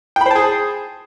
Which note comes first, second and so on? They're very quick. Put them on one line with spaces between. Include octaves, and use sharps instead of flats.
G5 B5 C5 A5 G#4